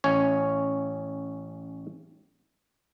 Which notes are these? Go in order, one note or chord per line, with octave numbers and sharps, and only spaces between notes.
A1 C#4 C#5